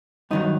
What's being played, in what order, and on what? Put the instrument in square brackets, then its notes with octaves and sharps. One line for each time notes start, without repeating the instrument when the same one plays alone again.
[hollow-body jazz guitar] G2 D#3 F#3 D#4